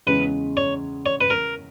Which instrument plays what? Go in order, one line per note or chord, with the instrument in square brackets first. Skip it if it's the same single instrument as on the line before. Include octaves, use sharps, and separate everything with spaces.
[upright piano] E2 C#3 G#3 C#4 [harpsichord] B4
[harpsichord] C#5
C#5
B4
A#4